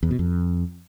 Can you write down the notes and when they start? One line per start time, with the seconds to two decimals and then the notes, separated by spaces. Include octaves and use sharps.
0.03 E2
0.11 B2
0.19 F2